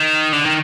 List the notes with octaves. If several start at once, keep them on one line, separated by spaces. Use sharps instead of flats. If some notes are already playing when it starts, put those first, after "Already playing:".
Already playing: D#3
D3
D#3